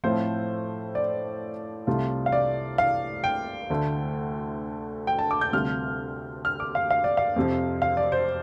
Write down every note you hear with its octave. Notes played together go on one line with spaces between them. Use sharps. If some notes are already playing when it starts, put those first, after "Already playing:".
A2 F3 A3 C4 F4 C5
D5
C2 C3 A3 F4
F5
D5
F5
G5
D2 D3 A3
G5
A5
D6
G6
D2 C3 G3 F4 F6
F6
D6
F5
F5
D5
F5
F2 C3 F3
F5
D5
C5